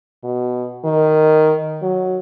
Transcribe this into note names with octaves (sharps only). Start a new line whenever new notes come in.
B2
D#3
F#3